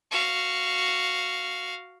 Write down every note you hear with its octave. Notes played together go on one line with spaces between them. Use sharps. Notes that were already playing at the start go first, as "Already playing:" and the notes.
F#4 F5